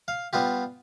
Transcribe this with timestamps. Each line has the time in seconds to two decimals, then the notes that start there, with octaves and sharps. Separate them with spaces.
0.08 F5
0.33 G3 B3 F4 G4